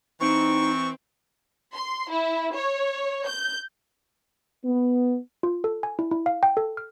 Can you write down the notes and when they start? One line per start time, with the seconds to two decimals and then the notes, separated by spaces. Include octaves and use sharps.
0.20 E3 C4 D#4 C#6
1.75 C6
2.11 E4
2.54 C#5
3.27 G6
4.65 B3
5.43 F4
5.64 A4
5.83 G#5
5.99 E4
6.11 E4
6.26 F5
6.43 G5
6.57 A4
6.77 F6